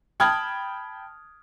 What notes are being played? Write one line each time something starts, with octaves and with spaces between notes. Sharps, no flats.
G5 A5 B5 D#6 F6 G#6